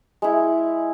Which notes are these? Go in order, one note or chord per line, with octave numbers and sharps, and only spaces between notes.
G#3 E4